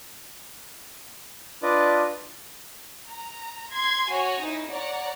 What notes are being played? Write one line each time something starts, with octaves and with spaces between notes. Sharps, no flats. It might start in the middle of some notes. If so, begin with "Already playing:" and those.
D4 F4 B4 D5 D#5
A#5
C6 G#6
F#4 C#5 G#5
D#4 E4
C#5 D5 F#5 A#5